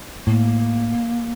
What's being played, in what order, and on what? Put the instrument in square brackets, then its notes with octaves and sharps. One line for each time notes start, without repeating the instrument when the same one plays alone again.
[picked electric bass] A2 [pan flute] A#3